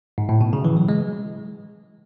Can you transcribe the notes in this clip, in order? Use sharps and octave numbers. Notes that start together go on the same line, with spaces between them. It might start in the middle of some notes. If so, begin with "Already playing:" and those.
G#2
A2
B2
C#3
E3
F#3
G#3